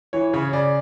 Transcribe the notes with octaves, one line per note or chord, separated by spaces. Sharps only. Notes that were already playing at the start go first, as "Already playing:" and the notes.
E3 C#5
C#3 C#5
C#3 D5